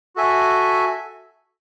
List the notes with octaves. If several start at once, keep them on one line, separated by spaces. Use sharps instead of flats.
F#4 A4 E5 G#5